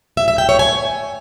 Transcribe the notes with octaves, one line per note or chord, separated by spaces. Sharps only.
E5
E5
G5
C#5
G#5